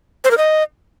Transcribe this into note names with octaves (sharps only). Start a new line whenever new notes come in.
C5
A#4
D#5